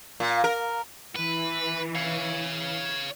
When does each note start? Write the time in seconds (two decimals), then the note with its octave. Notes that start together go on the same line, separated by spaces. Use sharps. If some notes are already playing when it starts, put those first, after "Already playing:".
0.20 A#2
0.44 A#4
1.16 E3 B4
1.95 C#5 F5